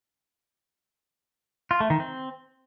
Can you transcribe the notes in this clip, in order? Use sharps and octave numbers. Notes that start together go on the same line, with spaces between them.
F4
A3
D#3
C4